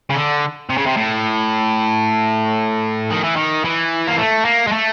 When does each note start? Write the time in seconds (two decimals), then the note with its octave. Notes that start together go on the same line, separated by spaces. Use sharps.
0.10 C#3
0.15 D3
0.69 C3
0.77 C#3
0.86 C3
0.96 A2
3.11 D#3
3.24 E3
3.36 D#3
3.65 E3
4.07 A#3
4.18 A3
4.45 A#3
4.67 G#3
4.72 A3